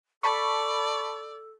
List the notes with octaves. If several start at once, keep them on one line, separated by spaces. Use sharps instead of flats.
A4 D5 A5 B5 C#6